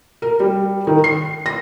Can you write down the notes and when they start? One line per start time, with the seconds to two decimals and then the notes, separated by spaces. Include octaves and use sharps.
0.22 A#4
0.40 G3
0.87 D#3
1.04 C7
1.46 A#6